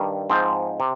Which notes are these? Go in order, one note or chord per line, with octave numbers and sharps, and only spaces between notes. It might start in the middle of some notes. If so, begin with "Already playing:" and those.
Already playing: G2 D#3 G3
G#2 F3 C4
C3